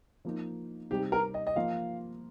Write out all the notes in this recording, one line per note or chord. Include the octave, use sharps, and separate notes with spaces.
F3 A#3 D#4
C3 G3 D#4 G4
A#4
D#5
D#5
F3 A#3 F4 F5